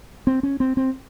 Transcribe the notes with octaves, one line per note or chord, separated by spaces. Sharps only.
C4
C#4
C4
C4